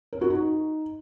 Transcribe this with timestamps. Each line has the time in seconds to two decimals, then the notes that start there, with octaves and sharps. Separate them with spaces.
0.13 A#4
0.21 F#4
0.30 D#4